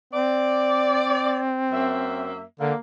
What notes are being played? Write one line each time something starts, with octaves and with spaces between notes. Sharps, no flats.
C4 D5
F#2 A#3 E5
D3 A#3